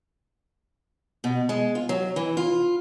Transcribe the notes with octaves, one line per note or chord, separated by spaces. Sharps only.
B2
G#3
F4
F#3
E3
F4